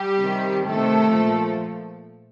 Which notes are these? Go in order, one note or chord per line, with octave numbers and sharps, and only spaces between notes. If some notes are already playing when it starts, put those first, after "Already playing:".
Already playing: G3 G4
C3 D#3
C3 D#3 A3 A4
A#2 F3